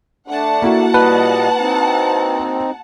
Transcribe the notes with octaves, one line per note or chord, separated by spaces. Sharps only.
A3 D4 F#5 A5
A#3 E4 F#4
A#2 G3 B4 D#5
C4 D#4